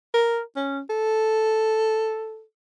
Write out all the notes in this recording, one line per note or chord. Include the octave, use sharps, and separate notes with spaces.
A#4
C#4
A4